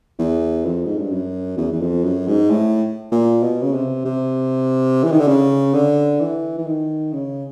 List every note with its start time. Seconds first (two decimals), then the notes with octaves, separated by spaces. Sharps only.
0.19 E2
0.66 F2
0.85 G#2
0.98 G2
1.12 F#2
1.57 E2
1.73 E2
1.81 F2
2.04 F#2
2.28 G#2
2.50 A2
3.12 A#2
3.42 B2
3.62 C#3
3.73 C3
4.05 C3
5.04 E3
5.12 D#3
5.20 D3
5.28 C#3
5.74 D3
6.20 E3
6.58 E3
6.67 D#3
7.13 C#3